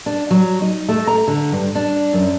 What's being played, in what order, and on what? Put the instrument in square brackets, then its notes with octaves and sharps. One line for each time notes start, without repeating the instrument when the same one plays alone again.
[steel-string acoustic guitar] D4
F#3
D#4
A3
A#5
D3
G2
D4
F#2